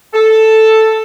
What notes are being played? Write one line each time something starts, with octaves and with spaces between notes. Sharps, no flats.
A4